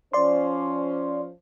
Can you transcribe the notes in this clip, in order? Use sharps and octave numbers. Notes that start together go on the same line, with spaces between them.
F3 C#4 C5 D5 C6